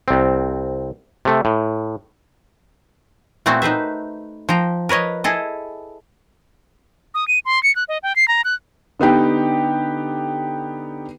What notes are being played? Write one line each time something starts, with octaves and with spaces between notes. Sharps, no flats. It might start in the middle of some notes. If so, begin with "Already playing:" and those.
C2 C4
C3 A3
A2
A#2 A3 B3 C4 E4 F#4
D#4 B4 C5 E5
F3 G5 A#5
A#4 B4 C#5 D#5
E4 G#4 A4 D#5
D#6
D#7
C6
C#7
F#6
D#5
G5
C7
A#5
F#6
D3 B3 D#4 G4